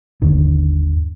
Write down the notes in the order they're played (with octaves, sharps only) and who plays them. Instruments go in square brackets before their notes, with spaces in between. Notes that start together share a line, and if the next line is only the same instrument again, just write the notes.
[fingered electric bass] G1 D#2 D3 D#3